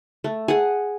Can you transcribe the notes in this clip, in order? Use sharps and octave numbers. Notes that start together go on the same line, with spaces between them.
A3
G#4 F#5